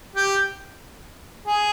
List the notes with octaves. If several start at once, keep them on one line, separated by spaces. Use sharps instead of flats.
G4
G#4